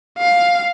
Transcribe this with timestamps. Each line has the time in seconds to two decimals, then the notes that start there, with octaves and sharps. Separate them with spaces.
0.18 F5